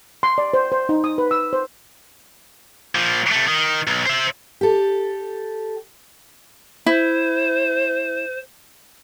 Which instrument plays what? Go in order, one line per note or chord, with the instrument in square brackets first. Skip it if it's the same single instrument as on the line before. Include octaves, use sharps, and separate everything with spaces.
[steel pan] C6
D5
C5
C5
D#4
D#6
B4
E6
C5
[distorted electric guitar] A#2 F3
C3 A3
D#3
B1
C5 E5
[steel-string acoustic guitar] G4 A4
[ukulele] E4 [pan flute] C5